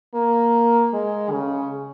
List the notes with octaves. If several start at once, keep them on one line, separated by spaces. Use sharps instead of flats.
A#3
G#3
C#3